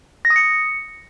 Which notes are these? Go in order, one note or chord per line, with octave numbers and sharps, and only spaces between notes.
A#6
D#6
C#7